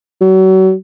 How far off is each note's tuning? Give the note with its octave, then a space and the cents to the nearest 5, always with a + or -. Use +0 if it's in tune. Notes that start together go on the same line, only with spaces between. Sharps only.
F#3 +35